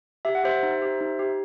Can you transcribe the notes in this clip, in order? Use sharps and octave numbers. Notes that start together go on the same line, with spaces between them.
G4 E5
F#5
G4 C5 E5
D#4
G4
D#4
G4